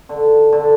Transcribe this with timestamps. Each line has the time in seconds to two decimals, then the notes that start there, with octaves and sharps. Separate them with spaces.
0.09 D3
0.52 D3